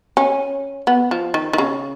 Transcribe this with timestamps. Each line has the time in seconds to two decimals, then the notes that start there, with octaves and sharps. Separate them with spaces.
0.17 C#4
0.87 B3
1.11 F3
1.34 D#3
1.53 D#3
1.58 C#3